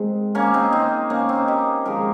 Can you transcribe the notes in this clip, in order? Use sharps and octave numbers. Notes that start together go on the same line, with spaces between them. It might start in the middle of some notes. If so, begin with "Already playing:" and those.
Already playing: G#2 D#3 G#3 C4
A#3 C#4
C4 D#4
C4 D#4
A#3 C#4
C4 D#4
D#4 G4
G#2 F3 G4 A#4